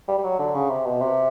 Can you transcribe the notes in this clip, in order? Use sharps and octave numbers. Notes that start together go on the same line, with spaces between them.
G3
G3
F#3
D3
C#3
C3
B2
C3